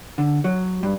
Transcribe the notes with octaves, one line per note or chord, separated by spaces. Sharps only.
D3
F#3
G2